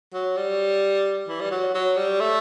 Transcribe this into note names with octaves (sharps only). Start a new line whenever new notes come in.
F#3
G3
E3
G3
F#3
F#3
G3
A3